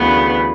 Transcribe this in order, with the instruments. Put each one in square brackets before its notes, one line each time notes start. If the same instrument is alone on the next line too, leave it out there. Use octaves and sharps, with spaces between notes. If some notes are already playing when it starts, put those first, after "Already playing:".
Already playing: [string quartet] D2 C#3 E3 B3